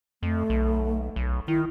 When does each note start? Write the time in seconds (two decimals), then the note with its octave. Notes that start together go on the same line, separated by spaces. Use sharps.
0.23 F2 A3
0.50 B1
1.16 B1
1.48 D#3 E4